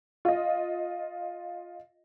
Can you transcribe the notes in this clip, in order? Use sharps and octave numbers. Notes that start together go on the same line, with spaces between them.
F4 D#5